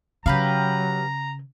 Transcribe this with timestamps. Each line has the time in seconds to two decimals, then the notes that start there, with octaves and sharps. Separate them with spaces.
0.26 C#3 F#3 G4 B4 F5 A#5